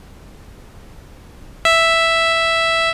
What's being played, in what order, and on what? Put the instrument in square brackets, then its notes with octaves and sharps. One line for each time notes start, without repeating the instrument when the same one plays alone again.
[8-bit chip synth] E5